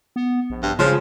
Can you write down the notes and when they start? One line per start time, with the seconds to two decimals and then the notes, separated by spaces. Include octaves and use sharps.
0.16 B3
0.50 A#1
0.63 G2
0.79 C#3 F3 G#3 C#4 F4